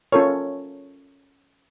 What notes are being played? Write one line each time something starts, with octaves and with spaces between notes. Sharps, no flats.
C#4 F4 A4 A#4 C#5